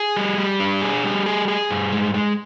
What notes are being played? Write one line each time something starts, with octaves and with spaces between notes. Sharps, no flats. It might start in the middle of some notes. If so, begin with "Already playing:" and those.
Already playing: G#4
G3
G3
D4
G#4
G3
G#4
G#4
G2
G#3
G#3